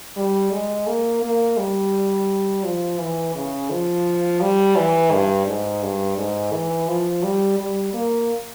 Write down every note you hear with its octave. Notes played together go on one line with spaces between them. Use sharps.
G3
G#3
A#3
A#3
G3
F3
E3
C#3
F3
G3
E3
G2
G#2
G2
G#2
E3
F3
G3
G3
A#3